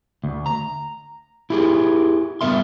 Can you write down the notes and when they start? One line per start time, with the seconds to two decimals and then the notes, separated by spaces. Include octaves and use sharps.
0.24 D2
0.46 A#5
1.50 E4 G4 G#4
2.41 G2 F3 B3 A#4 E5 C6